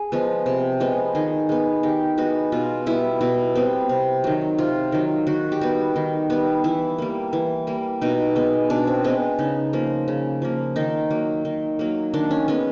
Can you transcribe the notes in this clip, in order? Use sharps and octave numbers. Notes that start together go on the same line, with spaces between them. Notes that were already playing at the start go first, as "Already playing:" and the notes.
Already playing: G#4
F3 G#3 B3
C3
F3 G#3 B3
D#3 G#4
G#3 B3
D#3 G4
G#3 B3 F#4
B2 F4
G3 B3 E4
B2 E4
G3 B3 C4
C3
D#3 F#3
C3 F4
D#3 F#3
D#3 F#4
G4
G3 B3 F#4
D#3
G3 B3
E3 E4
G3 A#3
E3
G3 A#3
B2 D#4
G#3 B3
B2 D4
C4
G#3 B3 C4
C#3 D#4
F3 A#3
C#3
F3 A#3
D#3 D#4
F#3 A#3
D#3
F#3 A#3
D#3 D4
C#4
G#3 B3 C#4